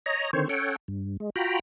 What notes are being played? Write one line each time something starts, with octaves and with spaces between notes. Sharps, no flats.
C#5 D#5 A#5
D3 D#3 C4 C5 C#5
C#4 A4 C#5 F#5 G5
G2
G#3
F4 F#4 G5 A#5 B5